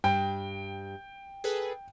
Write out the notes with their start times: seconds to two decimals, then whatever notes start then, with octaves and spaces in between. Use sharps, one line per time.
0.04 G2 G5
1.44 G#4 A4 B4